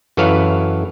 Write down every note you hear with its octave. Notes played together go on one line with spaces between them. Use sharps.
F#2 E3 A4 B4 C#5 F5